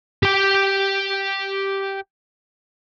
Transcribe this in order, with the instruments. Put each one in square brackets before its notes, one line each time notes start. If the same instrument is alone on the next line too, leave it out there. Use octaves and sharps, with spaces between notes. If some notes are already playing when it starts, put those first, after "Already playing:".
[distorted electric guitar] G4 G5